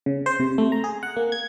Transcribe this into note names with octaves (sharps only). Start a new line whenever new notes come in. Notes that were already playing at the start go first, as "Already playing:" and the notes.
C#3
C5
C3
A3
A#5
G#4
F#5
A#3
G#6